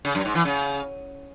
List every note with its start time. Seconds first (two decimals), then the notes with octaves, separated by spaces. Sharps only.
0.05 C#3
0.15 F#2
0.25 G#2
0.35 E3
0.45 C#3